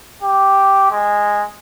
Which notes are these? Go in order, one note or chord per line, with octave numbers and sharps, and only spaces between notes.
G4
G#3